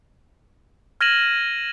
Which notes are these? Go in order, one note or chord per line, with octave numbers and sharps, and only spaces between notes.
F6 G#6 A#6 D#7 E7 F#7